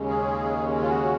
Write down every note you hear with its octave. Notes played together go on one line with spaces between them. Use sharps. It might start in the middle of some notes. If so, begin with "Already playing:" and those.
Already playing: D#2 C#3 G#3 C#4
G#4
F4
F#4